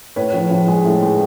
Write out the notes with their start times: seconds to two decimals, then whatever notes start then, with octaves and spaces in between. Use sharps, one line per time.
0.16 A2 B4 C#5
0.34 F3
0.51 F3
0.68 G#3
0.85 A2
1.03 G#3